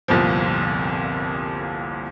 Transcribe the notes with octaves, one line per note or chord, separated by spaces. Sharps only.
G1 C2 F2 A#2 F3